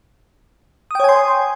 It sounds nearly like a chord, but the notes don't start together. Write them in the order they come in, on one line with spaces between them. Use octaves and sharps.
D#6 G5 C#5 G#5 C6